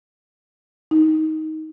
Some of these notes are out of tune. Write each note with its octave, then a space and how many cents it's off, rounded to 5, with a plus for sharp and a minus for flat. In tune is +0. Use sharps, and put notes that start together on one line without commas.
D#4 +15